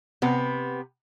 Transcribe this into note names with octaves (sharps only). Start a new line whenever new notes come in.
C3 B3